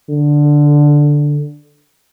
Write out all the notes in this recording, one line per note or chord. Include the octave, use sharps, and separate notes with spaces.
D3